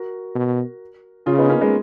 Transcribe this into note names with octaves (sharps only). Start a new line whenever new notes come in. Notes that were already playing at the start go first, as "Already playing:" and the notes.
Already playing: F#4 A#4
B2
C#3 F4 G#4
B3 D#4
A#3 C#4
G#3 B3